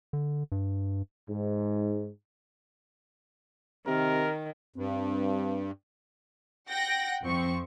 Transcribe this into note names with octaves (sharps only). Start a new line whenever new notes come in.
D3
G2
G#2
C3 D#3 A#4
G2 C4
F#5 G5 A#6
F2 F3 C4 C#6